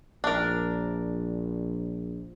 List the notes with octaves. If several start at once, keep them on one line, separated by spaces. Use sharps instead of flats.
A#1 D4 A#4